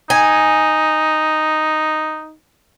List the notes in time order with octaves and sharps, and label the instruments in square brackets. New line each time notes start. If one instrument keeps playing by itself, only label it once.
[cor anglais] D#4 [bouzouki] G#5